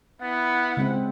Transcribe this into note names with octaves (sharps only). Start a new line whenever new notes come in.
B3 E4 F#5
C#3 G#3 C4